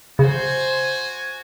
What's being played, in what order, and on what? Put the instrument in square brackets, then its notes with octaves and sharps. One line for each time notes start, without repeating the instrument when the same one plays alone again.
[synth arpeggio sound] C#3 [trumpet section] F#4 G#5 [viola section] C5